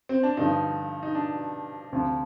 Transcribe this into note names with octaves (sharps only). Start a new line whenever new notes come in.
C4
D4
G2 D3 F3 D#4
D#4
D4
D2 C3 F3